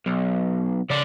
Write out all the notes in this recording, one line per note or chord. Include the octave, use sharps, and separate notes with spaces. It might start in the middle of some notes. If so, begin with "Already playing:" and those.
B1
C#3 D5